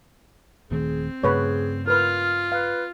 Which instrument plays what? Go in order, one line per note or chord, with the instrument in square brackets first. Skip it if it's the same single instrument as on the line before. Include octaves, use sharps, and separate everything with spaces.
[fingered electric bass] D#1 D#3 A3 [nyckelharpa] C4 [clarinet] G#4
[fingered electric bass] G2 C#3 A3 [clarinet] G#4 [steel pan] B4 C#5
[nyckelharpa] F4 [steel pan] A#4 B4 [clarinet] F6
[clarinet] B4 [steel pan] F5